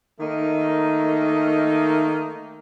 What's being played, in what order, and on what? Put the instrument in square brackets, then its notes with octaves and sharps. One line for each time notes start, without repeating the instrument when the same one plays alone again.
[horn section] D#3 A3 A#3 D#4